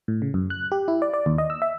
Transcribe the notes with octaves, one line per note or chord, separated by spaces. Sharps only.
A2
C#3
F#2
F#6
G4
E4
D5
D5
D#2
D#5
E6
E5